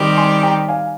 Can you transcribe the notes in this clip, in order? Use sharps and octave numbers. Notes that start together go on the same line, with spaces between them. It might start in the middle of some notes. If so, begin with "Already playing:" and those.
Already playing: D#3 G3 C4 G4
G#5 C6
G5 A#5
F5 G#5